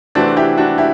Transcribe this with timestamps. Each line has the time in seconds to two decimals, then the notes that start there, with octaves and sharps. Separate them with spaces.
0.15 C3 E3 A3 C4 D4 F#4
0.36 E4 G4
0.57 D4 F#4
0.78 E4 G4